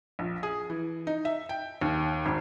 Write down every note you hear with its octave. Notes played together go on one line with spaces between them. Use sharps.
A#1
G#4
E3
D#4
E5
G5
D#2
G#1